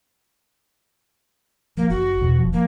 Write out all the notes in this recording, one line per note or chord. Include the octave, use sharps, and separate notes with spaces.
F3 A#3
F#1 F#4
E2 B2
E1 F3
F3 A#3